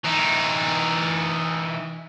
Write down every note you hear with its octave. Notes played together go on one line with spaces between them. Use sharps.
E3 D#4